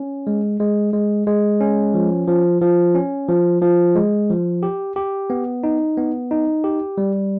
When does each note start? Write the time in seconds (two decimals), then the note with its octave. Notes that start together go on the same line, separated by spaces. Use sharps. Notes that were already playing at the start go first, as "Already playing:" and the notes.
Already playing: C#4
0.27 G#3
0.60 G#3
0.93 G#3
1.27 G#3
1.61 C#4
1.94 F3
2.27 F3
2.61 F3
2.95 C#4
3.28 F3
3.62 F3
3.95 G#3
4.30 F3
4.63 G4
4.96 G4
5.30 B3
5.63 D#4
5.97 B3
6.31 D#4
6.64 G4
6.98 G3